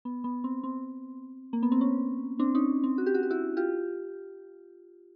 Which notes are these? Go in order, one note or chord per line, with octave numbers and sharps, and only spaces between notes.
B3
B3
C4
C4
A#3
B3
C4
C#4
C4 D4
C#4 D#4
C4
F#4
G4
F#4
G4
E4 F#4
F4 G4